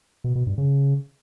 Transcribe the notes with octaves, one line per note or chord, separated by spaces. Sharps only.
B2
B2
G2
C#3